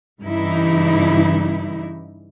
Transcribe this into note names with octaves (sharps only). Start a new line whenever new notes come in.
G2 C#3 E3 D#4 E4